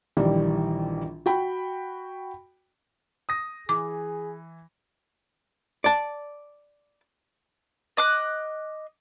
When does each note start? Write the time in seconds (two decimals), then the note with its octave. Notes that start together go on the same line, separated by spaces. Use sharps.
0.17 A#1 D#3 E3 G3
1.26 F#4 G5 B5
3.29 D#6 A#6
3.69 E3 G#4 D6
5.84 D5 A5
7.97 D#5 D6 F#6